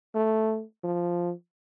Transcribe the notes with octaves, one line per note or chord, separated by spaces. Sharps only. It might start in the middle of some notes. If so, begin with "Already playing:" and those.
A3
F3